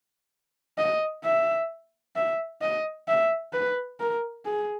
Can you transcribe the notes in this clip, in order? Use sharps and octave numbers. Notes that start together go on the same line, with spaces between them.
D#5
E5
E5
D#5
E5
B4
A#4
G#4